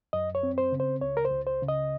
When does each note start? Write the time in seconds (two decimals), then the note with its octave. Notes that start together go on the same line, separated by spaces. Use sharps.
0.13 F#2 D#5
0.35 C#5
0.43 C4
0.58 C5
0.72 C#3
0.80 C5
1.01 C#2 C#5
1.17 A#4
1.25 C5
1.31 C#2
1.47 C5
1.62 C#3
1.69 D#5